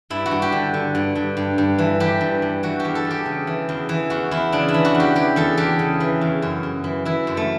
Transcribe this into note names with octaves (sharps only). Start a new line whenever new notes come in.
G2 E4
F#4
G2
G4
D3
D3
G2
G2
G2
G2
E3
E3 G4
G2
G2
E3 F#4
G4
E2
A4
E2
G4
C#3
E3
E2
E3
E2 F#4
E2 E4
C#3 D4
E4
E3
F#4
E2
G4
E3 G4
E2 A4
E2 G4
C#3
E3
E2
F#2
F#2
E3
E3 E4
F#2
A3